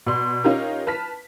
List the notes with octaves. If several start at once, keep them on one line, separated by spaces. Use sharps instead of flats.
B2 D5 C6
C#4 D#4 F4 G4 A#4
B4 A5 F6 B6